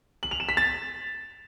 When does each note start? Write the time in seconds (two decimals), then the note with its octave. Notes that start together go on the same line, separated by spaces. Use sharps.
0.23 F#7
0.31 F7
0.40 E7
0.49 B6
0.57 A6